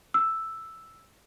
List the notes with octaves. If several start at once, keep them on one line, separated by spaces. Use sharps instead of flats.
E6